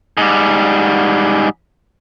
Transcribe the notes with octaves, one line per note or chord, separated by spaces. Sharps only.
G#2 G3